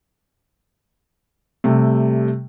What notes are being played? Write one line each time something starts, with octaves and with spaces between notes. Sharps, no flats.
C3 G3 A3